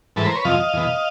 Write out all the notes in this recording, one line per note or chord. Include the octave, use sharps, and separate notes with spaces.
G#2 E3 A4 B4
A#4 C5
B4 C#5
F2 C3 F3 D#5 F5
E2 B2